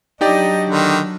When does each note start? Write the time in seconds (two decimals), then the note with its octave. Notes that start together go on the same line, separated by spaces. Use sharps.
0.21 F#3 D4 D#4 G4 D5 D#5
0.69 D3 D#3